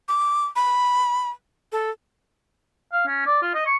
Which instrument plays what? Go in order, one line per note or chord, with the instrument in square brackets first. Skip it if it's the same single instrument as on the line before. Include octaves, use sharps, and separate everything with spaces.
[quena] D6
B5
A4
[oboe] F5
C#4
D5
F4
D#5
C#6